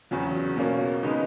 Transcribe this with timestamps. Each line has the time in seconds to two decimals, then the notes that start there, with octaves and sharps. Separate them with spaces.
0.11 E2 C#3 F#3
0.57 B2 A#3 C#4
1.03 C#3 G#3 B3 D#4